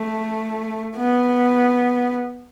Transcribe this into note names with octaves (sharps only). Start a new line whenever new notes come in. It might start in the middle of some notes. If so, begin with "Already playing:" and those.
Already playing: A3
B3